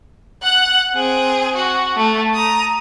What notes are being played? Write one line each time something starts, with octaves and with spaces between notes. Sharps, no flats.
F#5 F#6
C4 G#4
F#4
A3
A#5 D#6